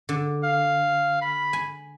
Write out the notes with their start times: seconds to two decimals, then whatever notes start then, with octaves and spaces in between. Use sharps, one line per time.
0.09 D3
0.43 F5
1.22 B5
1.53 G#5